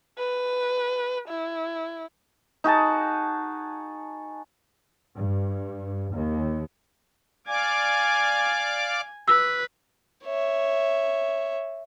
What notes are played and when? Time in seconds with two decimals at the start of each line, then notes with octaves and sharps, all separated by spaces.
0.18 B4
1.28 E4
2.64 D#4 F#4 G#4 A5
5.16 G2
6.13 D#2
7.47 D5 F5 G#5 D6
9.28 B4 E6
10.25 C#5 E5